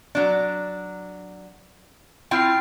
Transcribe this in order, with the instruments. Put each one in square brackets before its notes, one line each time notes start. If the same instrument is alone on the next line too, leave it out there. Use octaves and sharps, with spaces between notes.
[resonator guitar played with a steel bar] F#3 D4
[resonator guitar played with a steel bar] C4 E4 F4 [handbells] G5 F6 C7